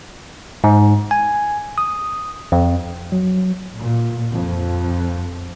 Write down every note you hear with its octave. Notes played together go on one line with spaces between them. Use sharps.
G#2
G#5
D#6
F2
F#3
A#2
F2